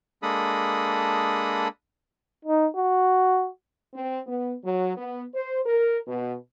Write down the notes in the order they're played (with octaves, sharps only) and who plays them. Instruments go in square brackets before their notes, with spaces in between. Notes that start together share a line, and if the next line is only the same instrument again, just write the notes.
[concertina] G#3 A#3 D4 A4 B5 D#6
[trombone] D#4
F#4
[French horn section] C4
B3
F#3
B3
C5
A#4
B2